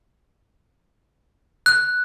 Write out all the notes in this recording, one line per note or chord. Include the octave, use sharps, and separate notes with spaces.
F#6